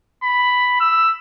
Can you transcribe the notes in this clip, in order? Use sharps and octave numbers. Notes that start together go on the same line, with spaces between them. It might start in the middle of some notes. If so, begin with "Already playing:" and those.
B5
E6